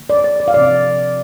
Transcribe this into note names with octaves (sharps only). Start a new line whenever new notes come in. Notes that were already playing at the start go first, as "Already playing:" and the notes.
Already playing: D3 F3 A#3
D5
D5
D5
F5
C3 F3 C4 D5